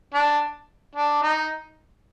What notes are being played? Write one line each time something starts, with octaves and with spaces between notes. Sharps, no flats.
D4
D4
D#4